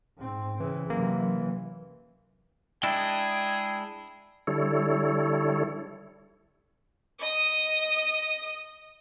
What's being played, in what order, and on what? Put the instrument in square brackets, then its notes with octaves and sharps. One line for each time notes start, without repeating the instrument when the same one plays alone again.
[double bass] G#2 C4
[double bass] C#3 [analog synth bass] E3
[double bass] F#2 C3 [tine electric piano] A#3
[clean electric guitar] G#3 D4 E4 [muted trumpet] G#4 [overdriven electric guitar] G5
[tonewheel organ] D3 G3 E4 A4 C#5
[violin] D#5 D#6